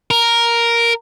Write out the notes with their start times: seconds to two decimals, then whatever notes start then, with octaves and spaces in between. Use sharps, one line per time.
0.11 A#4